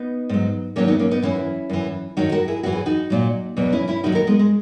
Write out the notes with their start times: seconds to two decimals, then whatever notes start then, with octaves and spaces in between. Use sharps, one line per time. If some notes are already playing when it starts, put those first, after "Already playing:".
Already playing: B3 D#4
0.29 G#2 F#3
0.76 E2 D#3 F#3 A#3 C#4
0.88 B3 D#4
0.99 A#3 C#4
1.11 B3 D#4
1.22 F#2 E3 C#4 E4
1.70 F#2 E3
2.17 F#2 D#3 F#3 D#4 F#4
2.32 F#4 A#4
2.48 E4 G#4
2.63 F#2 E3 F#4
2.75 G#4
2.86 D#4 F#4
3.10 A#2 F#3
3.57 E2 B2 F#3
3.72 C#4 E4
3.88 C#4 E4
4.04 D#2 D#3 F#3 D#4 F#4
4.15 F#4 A#4
4.27 G#3 B3
4.39 G#3